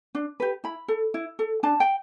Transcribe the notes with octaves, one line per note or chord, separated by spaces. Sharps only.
D4
G4 B4
E4 B5
A4
E4
A4
D4 A5
G5